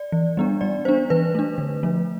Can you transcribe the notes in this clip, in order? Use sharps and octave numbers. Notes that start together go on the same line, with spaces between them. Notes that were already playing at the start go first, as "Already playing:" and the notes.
Already playing: D5
E3
G3 B3 D4
G3 D5
B3 D4 C5
E3 B4
A3 D4
D3
F3 A3